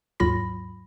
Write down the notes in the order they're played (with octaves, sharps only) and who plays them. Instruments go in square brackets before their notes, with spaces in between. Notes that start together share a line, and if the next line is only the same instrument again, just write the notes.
[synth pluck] D#2 G#2 F#3 F4 B5 A#6